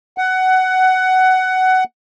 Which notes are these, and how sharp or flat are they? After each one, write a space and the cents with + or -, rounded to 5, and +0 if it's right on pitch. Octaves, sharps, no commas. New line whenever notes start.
F#5 +15